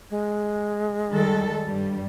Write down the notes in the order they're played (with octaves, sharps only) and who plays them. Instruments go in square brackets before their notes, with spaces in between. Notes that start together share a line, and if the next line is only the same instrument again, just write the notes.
[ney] G#3
[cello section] D#3 G3 A4
G2 G3